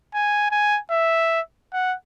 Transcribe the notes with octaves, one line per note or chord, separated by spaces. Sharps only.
G#5
G#5
E5
F#5